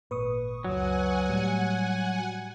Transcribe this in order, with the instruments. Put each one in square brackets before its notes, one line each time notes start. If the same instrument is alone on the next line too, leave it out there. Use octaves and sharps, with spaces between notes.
[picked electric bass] G#1 A#2 [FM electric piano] B4 C#6 D#6
[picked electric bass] F#1 C#2 [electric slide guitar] F#3 [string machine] F#5 G#5
[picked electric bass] A2 [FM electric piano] G3